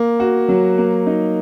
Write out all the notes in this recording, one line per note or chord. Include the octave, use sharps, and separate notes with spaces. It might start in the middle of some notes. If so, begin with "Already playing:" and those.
Already playing: A#3
F#4
F#3
A#3
D#4